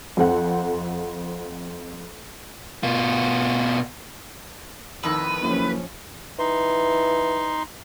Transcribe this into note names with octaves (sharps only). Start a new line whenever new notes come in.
F2 C4 A4 F#5
B2 F4
F2 A2 D#3 B4
F#1 F3 C#4
E3 D#4 C6